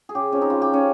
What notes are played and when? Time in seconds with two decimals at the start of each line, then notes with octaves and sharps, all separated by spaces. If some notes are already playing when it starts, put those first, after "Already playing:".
0.09 G#4
0.15 C#3 G4
0.32 F3 C4 C#4
0.41 D#4
0.50 C#3 F4
0.62 G4
0.67 F3 C4
0.73 C#4